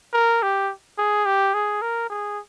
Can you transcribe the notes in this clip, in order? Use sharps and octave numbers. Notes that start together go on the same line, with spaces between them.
A#4
G4
G#4
G4
G#4
A#4
G#4